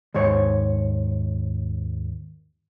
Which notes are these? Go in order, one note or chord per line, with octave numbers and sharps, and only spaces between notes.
D#2 G#2 C5 C#5